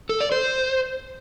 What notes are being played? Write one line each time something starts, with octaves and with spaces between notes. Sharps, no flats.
A4
D5
C5